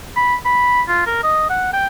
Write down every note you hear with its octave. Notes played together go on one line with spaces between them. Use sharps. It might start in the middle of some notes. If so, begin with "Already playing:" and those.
B5
B5
F4
A#4
D#5
F#5
G5